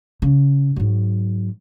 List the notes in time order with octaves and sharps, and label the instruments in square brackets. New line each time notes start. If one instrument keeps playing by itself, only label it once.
[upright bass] C#3
G#2 F#3